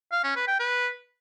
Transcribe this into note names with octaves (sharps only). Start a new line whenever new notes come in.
F5
C#4
B4
G5
B4